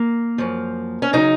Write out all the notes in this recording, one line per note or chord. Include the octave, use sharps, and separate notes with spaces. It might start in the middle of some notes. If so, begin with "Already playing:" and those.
Already playing: A#3
F#2 F3
C#4
C#3 F#3 D#4